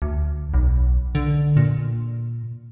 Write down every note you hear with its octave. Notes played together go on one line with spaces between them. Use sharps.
D2
B1
D3
A#2